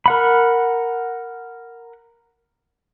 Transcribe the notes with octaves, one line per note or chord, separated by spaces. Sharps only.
A#4 F#5 B5